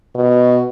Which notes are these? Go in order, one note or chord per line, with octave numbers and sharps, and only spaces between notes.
B2